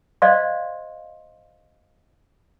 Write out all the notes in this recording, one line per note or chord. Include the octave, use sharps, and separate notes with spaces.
C5 D5 D#5 F5 C6